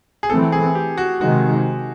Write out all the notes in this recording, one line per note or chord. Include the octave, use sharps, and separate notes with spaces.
G#4
E3 A3 C4 A4
G#4
G4
F#4
C3 D#3 G#3 F#4